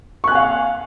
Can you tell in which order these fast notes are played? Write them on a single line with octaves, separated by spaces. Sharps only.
C#6 F#6 G#5 F5